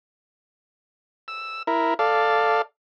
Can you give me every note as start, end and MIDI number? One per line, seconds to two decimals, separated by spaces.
1.28 1.63 88
1.67 1.94 64
1.67 1.94 70
1.99 2.62 69
1.99 2.62 74
1.99 2.62 77